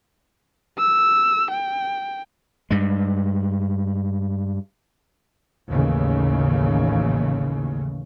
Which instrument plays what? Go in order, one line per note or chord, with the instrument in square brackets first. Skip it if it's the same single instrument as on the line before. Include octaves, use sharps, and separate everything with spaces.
[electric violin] E6
G5
[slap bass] G2 G#3
[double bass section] A1 D#2 C#3